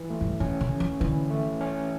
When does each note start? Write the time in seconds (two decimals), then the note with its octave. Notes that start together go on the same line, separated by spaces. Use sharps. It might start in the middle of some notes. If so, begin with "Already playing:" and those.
Already playing: E3
0.10 A3
0.21 G2
0.40 A2 C#4
0.61 C#3
0.71 A2
0.80 E3
1.00 D3 E3
1.31 A3
1.61 C#4